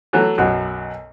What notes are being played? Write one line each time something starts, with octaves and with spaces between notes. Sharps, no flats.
E3 F#3 A3
B1 F#2 F#3